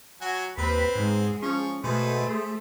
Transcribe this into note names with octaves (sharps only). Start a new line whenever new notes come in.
F#3 F#4 G#5
D#2 C4 B4
G#2 G#3 G#4
F3 C#4 C#6
B2 A3 G#4 B4 C5
G#4 C5